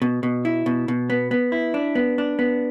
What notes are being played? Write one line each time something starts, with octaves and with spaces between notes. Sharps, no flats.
B2
B2
E4
B2
B2
B3
B3
E4
D4
B3
D4
B3